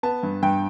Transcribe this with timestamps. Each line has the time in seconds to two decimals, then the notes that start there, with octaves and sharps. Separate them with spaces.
0.03 B3 A5
0.23 G2
0.43 G2 G5